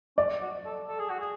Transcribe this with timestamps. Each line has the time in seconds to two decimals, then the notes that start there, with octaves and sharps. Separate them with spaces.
0.18 C#4 D5
0.41 F#4
0.66 A4
0.88 A4
0.99 G#4
1.10 F#4
1.20 G#4